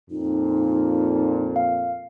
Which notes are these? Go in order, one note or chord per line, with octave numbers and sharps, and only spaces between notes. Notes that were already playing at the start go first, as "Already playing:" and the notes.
F2 A#2 D#4
F5